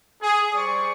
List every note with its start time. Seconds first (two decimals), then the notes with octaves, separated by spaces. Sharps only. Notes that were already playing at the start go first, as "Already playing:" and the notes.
0.22 G#4
0.54 G3 C5 D5 C#6